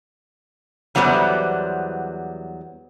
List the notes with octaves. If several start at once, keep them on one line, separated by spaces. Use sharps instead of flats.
E2 F#3 G3 B3 C5 D5